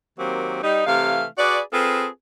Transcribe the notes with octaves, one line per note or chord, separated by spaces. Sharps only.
D#3 F#3 A#3 C4 G4
G3 D#4
C3 E3 A3 F5
F#4 G#4 B4 D5
C4 F4 G#4 A4 B4